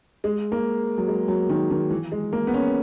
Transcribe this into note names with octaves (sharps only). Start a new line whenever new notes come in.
G#3
A#3
F#3
G#3
F#3
D#3
D#3
E3
G#3
A#3
B3
C#4